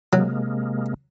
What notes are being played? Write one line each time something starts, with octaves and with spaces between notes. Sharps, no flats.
C3 F#3 G#3 A#3